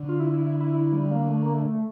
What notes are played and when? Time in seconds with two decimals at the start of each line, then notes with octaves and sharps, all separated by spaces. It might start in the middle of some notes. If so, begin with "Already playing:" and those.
Already playing: D3
0.09 F4
0.20 E4
0.34 E4
0.46 E4
0.60 E4
0.74 E4
0.93 G3
1.11 A#3
1.29 A3
1.42 A#3
1.54 A3